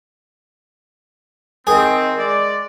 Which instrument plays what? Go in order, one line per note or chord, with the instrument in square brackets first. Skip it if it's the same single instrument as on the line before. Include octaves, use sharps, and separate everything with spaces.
[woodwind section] D#3 C4 [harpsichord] G#4
[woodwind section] G#3 D5